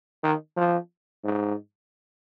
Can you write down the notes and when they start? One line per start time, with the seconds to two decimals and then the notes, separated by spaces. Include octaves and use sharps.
0.23 D#3
0.57 F3
1.24 G#2